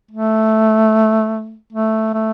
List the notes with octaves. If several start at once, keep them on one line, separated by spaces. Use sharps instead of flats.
A3
A3
A3